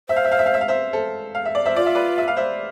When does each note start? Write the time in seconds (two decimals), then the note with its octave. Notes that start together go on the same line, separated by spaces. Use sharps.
0.09 C5 E5
0.16 F5
0.24 E5
0.32 F5
0.39 E5
0.46 F5
0.54 E5
0.61 F5
0.68 C5 E5
0.93 A4 C5
1.35 F5
1.45 E5
1.55 D5
1.66 C5 E5
1.76 F4 D5
1.86 E5
1.95 B4 D5
2.18 E5
2.28 F5
2.37 C5 E5